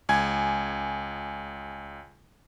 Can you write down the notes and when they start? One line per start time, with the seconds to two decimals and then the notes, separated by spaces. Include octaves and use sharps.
0.09 C#2 G#5 G#6